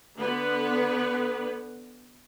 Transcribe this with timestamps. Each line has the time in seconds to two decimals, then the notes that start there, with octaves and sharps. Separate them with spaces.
0.17 D3 B3 B4